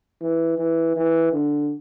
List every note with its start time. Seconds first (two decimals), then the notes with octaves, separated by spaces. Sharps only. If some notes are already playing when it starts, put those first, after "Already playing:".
0.21 E3
0.58 E3
0.96 E3
1.33 D3